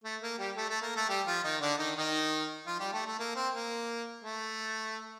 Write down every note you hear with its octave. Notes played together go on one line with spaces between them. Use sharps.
A3
A#3
G3 G4
A3 A4
A3 A4
A#3 A#4
A3 A4
G3 G4
F3 F4
D#3 D#4
D3 D4
D#3 D#4
D#3 D#4
F3 F4
G3 G4
A3 A4
A3 A4
A#3
C4
A#3
A3